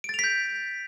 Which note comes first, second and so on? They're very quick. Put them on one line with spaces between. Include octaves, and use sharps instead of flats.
D7 A6 F7 B6 G6